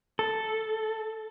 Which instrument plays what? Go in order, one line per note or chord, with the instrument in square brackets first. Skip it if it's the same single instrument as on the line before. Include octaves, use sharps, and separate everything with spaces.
[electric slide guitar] A4